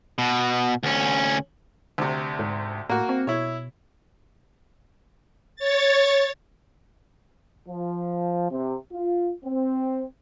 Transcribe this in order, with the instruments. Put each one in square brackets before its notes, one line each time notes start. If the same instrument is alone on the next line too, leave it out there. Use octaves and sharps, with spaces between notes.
[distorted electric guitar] B2
D2 C#4
[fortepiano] D2 C3
[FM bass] G#2
[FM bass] A2 [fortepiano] A#3 F#4
[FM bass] C4
[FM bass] B2 [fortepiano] E4 C#5
[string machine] C#5 A6
[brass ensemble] F3
C3
F4
C4